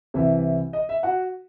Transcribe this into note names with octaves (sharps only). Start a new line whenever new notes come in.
C2 C3 E3 E5
D#5
E5
F#4 F#5